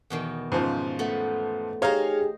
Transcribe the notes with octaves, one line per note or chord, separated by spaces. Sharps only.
E2 B2 D#3
G#2 C#3 F3
A3 B3
D#4 G4 G#4 C5 C#5 D#5 F5 A#5